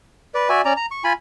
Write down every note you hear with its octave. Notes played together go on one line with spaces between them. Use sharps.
B4 D5
F#4 D5 E5 G#5
C#4 D5 A#5
A#5
C#6
F4 G#5 B5